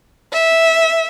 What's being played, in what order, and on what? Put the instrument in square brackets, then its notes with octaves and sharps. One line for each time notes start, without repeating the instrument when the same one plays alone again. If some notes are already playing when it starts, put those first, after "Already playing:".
[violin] E5